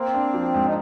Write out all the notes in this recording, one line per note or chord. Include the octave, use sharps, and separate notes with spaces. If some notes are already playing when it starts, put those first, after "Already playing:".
Already playing: A#3 C4
D4
F3
G#2
D#4